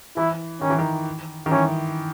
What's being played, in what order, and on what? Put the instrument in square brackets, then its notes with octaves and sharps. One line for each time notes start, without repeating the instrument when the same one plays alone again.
[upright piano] E3 [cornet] E4
[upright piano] D#3 [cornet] C#4
[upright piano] E3
D#3
D#3
[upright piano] E3 [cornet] C#4